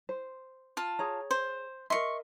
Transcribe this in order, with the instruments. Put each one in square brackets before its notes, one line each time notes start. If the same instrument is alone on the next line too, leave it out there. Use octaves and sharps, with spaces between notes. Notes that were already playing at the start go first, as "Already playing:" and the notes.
[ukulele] C5
[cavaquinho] F4 A5
[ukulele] G#4 C#5 A#5
[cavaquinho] C5
[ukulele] A#4 D#5 E5 [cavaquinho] C6 C#6